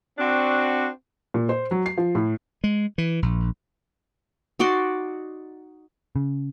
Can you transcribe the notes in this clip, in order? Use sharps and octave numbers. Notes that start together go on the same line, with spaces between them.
C4 D4 F#4
A#2
C5
F#3
C7
F3
A2
G#3
E3
A#1
D#4 F#4 D5 C6
C#3